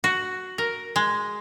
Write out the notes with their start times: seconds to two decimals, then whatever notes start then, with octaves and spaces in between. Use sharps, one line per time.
0.04 F#4
0.58 A#4
0.96 G#3